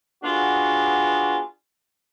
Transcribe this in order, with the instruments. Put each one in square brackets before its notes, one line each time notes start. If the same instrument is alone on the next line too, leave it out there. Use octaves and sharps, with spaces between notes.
[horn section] B3 D4 F4 F#4 G#4